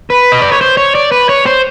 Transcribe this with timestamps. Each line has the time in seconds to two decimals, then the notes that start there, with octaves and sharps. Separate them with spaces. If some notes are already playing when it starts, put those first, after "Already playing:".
0.10 B4
0.32 D#5
0.42 D5
0.52 C#5
0.61 C5
0.77 C#5
0.95 D5
1.12 B4
1.29 C#5
1.46 C5